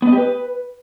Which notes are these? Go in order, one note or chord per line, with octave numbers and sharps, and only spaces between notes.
B3
D#5
G4
B4